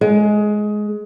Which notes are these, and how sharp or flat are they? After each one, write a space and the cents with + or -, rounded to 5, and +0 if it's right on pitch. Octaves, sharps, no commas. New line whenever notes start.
G#3 +15